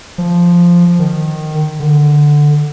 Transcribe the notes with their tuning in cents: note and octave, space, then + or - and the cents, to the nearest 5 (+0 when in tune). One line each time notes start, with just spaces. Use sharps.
F3 -5
D#3 -15
D3 +5